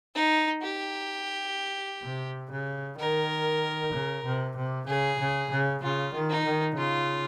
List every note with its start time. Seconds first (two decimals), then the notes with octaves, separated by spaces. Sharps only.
0.15 D#4
0.62 G4
2.04 C3
2.51 C#3
2.98 D#3 A#4
3.93 C#3
4.25 C3
4.57 C3
4.87 C#3 G#4
5.19 C#3
5.51 C#3
5.82 C#3 F4
6.14 D#3
6.30 D#4
6.45 D#3
6.77 C#3 F4